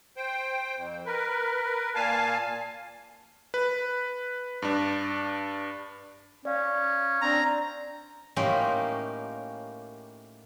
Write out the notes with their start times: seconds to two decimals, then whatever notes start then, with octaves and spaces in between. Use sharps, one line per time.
0.17 C5 G5
0.77 F2
1.06 A#4 B4
1.95 A#2 F5 G#5 A5
3.54 B4
4.62 G2 D4
6.45 C#4 D5 F5
7.22 C4 D4 A#5
8.36 A2 A#3 C#4 D#4 F4 G4